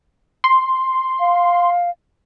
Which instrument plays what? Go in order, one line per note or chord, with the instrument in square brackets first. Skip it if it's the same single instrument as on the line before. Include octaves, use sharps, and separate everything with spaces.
[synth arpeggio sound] C6
[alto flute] F5